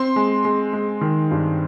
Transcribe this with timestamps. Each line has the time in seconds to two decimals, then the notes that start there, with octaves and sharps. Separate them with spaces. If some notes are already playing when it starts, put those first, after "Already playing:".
Already playing: C4 C6
0.16 G#3
0.45 G#3
0.73 G#3
1.01 D#3
1.31 G2